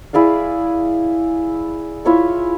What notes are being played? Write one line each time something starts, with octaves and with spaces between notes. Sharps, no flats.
E4 G#4 D5 F5
E4 F4 C#5 E5